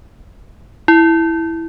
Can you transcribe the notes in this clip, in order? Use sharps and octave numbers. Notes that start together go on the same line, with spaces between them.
E4